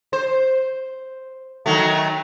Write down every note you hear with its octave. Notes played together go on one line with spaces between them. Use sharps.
C5
D#3 F#3 A3